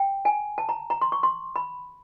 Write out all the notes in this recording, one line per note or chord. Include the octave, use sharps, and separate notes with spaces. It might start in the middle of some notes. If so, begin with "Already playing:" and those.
Already playing: G5
G#5
A5
A#5
A#5
C6
C#6
C6
B5